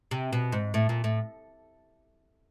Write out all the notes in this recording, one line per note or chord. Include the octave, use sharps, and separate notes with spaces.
C3
B2
G#2
A2
A#2
A2